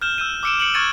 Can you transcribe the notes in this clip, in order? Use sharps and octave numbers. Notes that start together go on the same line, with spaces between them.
F6 G6 E7 G7
E6 G6 D#7
D6 E6 C#7 D7 E7
C#7 D7 F#7
C#6 F6 G#6 A6 C#7 D#7